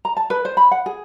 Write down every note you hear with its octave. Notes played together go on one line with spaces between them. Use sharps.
A#5
A5
B4
C5
B5
F#5
G#4